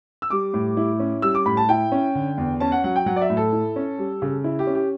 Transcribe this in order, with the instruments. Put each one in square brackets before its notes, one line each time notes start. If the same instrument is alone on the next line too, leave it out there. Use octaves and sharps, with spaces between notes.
[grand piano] E6
G3 D6
A2
E4
C#4
G3 E6
D6
A2 B5
A5
E4 G5
C#4
D3
E2
C#4 A5
F#5
F#3 F#5
G5
F#3 F#5
D5
E5
A2
A4
E4
C#4
G3
C#3
E4
G4
C#4
G4